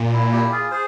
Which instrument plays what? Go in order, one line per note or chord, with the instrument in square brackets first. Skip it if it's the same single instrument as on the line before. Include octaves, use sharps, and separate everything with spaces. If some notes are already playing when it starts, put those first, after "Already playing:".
Already playing: [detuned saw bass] A#2
[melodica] E4
E4 G4
F4 G#4
G#4 C5